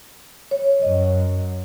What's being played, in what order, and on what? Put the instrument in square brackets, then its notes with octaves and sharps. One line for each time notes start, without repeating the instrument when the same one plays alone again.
[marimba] C#5
[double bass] F#2 [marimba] D#5